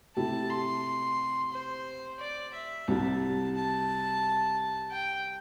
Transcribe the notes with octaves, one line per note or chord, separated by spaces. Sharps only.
C3 A3 E4 G4 A5
C6
C5
D5
E5
C2 C3 G3 A5
A5
G5